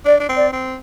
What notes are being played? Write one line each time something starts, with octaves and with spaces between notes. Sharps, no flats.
D4 D5
D4
C4
D5
C4